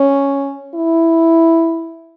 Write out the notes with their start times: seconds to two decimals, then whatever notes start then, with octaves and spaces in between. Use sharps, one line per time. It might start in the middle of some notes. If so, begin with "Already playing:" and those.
Already playing: C#4
0.75 E4